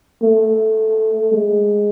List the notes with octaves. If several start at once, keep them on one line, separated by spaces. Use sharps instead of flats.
A3
G#3